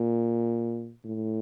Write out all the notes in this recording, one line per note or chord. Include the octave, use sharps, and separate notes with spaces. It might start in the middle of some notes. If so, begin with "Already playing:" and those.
Already playing: A#2
A2